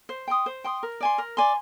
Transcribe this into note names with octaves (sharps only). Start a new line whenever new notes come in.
C5
G5 C6 D#6
C5
G5 C6 D#6
A#4
D5 G#5 C6
A#4
D5 G#5 C6